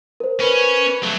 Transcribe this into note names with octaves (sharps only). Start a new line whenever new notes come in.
A#4 C5
C#4 B4
F#3 A3